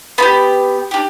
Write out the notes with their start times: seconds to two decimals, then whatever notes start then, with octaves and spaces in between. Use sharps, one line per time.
0.18 B3 D4 B5
0.22 G4
0.91 D4 G4